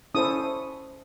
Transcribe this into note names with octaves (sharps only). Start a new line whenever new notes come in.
C#4 E4 A4 C5 D#6